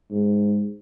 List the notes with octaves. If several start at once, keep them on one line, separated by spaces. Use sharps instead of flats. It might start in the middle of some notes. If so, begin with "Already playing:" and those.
G#2